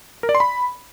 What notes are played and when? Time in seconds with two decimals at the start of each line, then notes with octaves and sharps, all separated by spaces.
0.23 A#4
0.29 D5
0.35 C6
0.40 B5